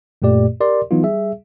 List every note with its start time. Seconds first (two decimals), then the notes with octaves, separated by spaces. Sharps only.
0.22 F#2 A#2 A3 G4 D5
0.60 G4 A#4 D5 C6
0.91 E3 F#3 B3 D#4 F4
1.02 G3 G#4 E5